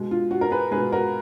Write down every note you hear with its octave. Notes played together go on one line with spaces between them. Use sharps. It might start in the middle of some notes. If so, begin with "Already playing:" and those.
Already playing: B2 G#3
F4
F#4
A#4
G#4 B4
B2 G#3 G#4 B4
F#4 A#4